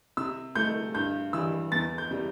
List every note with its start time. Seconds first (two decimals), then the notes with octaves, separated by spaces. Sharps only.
0.17 C3 E6
0.55 A3 G6
0.95 G2 G6
1.33 E3 G3 E6
1.72 E2 A6
1.98 G6
2.11 C3 G3